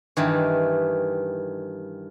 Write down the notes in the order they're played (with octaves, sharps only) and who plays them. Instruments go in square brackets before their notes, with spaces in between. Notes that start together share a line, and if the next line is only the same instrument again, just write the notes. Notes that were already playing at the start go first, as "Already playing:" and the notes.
[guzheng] G2 D#3 E3